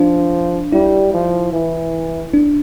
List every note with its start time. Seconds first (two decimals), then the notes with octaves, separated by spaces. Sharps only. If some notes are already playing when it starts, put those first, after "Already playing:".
Already playing: F3 D4
0.72 G3 E4
1.14 F3
1.53 E3
2.34 D4